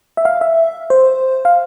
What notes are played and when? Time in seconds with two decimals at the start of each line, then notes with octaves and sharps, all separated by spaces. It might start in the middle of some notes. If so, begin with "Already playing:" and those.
0.17 E5
0.25 F5
0.41 E5
0.90 C5
1.45 F5